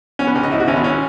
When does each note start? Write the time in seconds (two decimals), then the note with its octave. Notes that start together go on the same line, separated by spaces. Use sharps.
0.19 B2 C#4
0.27 B3
0.35 C#2 C#4
0.43 D#4
0.51 G#2 E4
0.60 F#4
0.68 G#1 C#4
0.76 B3
0.84 C#4